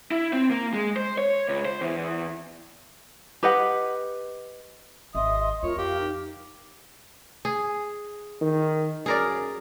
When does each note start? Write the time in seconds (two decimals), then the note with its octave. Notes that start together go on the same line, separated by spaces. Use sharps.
0.11 E4
0.33 C4
0.51 A#3
0.74 G#3
0.96 C5
1.18 C#5
1.48 C#2
1.65 C5
1.81 E2
3.43 G4 B4 D#5 F#5
5.15 G#1 D#5 E5 C6 D#6
5.63 F2 F4 A#4 C#5
5.78 G4 F5
6.00 D#4
7.45 G#4
8.42 D#3
9.06 F#2 G#4 A#4 D5